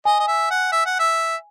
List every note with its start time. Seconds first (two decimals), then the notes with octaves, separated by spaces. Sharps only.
0.05 D#5 G#5
0.20 D#5
0.28 E5
0.50 F#5
0.72 E5
0.86 F#5
0.99 E5